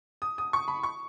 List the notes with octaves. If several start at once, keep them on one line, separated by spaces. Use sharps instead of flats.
D#6
D#6
C#6
B5
C#6